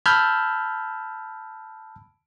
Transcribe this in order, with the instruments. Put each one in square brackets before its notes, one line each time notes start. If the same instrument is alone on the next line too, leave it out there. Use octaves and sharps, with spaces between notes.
[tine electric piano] A5 B5 E6 F6 G6 G#6